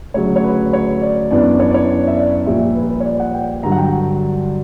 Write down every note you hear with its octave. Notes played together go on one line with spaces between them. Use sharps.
D2 C#3 F#3 C#5
C#5
B4
C#5
D5
F#2 E3 B3 D4 D5
C#5
D5
C#5
E5
D5
A#1 A#2 G3 E5
B4
B4
C#5
D5
F#5
G5
G2 D3 F#3 A#5
F#5
G5